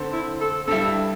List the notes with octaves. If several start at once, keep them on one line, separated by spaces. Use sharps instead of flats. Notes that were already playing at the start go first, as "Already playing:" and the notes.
Already playing: D3 C4 A4 C5
E4
A4
G2 G3 E4 A4